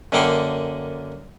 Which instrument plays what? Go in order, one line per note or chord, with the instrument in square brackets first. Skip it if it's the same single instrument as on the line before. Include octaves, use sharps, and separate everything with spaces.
[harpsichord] F#2 D3 A#3 A4 G5 C6